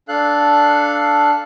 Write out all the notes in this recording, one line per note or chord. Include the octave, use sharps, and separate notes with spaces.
D4 A4 F5 F#6